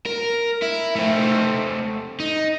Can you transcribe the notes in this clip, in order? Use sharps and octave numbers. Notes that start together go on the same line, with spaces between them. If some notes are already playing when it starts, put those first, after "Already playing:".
A#4
E4
A3 C4
D#4